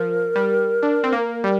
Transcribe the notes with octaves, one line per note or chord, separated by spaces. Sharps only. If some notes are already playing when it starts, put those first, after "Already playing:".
Already playing: F3 A#4
G3
D4
C4
A#3
G3